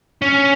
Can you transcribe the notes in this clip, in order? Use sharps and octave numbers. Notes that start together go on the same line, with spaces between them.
C#4